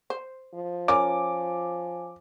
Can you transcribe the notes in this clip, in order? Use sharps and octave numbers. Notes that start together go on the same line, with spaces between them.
C5
F3
C#4 F4 A#4 G#5 D6